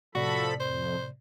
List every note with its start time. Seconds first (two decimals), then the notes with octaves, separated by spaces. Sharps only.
0.15 A2 C3 F3 F#4 A4 D5 B5
0.60 F2 C5